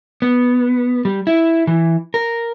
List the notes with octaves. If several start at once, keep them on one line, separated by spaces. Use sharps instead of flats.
B3
G3
E4
E3
A#4